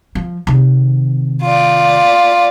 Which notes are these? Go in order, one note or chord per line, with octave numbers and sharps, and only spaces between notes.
F3
C3 D#3
F4 D5